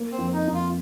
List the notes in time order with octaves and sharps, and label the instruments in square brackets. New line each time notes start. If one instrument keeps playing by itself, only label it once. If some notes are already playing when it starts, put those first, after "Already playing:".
Already playing: [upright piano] A#3
[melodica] C4
[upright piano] F2
[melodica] D#4
[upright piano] F2
[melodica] F4